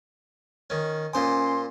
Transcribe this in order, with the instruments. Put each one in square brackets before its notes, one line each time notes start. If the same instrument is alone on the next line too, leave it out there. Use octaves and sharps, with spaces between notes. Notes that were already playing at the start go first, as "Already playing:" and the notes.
[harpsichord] D#3 C#4
[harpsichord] A#2 C5 D#6 [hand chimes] C#4 G#5 [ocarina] C6